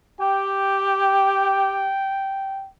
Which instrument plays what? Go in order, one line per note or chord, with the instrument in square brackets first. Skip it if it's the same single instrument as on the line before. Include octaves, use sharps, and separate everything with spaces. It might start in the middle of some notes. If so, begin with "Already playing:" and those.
[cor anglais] G4 [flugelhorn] G5